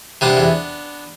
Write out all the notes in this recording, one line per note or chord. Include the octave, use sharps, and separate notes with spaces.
C3 B3 D4
E2